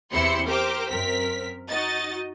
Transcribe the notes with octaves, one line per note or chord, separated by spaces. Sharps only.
E2 C3 C4 E4 C6 C#7
G4 A#4 C5 G5 D6
F#2 C4 A#4 B6
D#4 F#4 D#5 A6